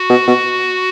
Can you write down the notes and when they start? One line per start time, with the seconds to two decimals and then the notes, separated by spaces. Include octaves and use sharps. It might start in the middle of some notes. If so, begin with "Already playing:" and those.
Already playing: F#4
0.10 B2
0.27 B2